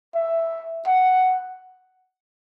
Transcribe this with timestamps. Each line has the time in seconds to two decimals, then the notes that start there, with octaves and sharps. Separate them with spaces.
0.15 E5
0.87 F#5